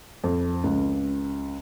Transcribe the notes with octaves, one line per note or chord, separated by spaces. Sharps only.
F2
C#2